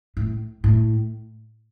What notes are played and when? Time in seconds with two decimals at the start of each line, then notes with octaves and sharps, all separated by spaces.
0.17 A2
0.64 A2